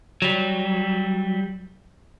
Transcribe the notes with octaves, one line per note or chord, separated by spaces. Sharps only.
F#3 G3